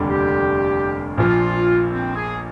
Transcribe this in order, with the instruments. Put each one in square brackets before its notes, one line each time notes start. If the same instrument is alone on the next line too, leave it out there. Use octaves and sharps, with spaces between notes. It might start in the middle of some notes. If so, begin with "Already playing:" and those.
Already playing: [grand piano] F1 D#2 D3 G3 D4
[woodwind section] G4
[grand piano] A#1 A#2 F3 [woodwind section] F4
[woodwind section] C4
G#4